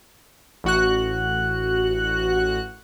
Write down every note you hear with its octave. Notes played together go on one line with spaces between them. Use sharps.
A1 F#4 F#6